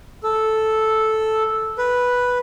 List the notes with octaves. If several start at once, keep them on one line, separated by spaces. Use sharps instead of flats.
A4
B4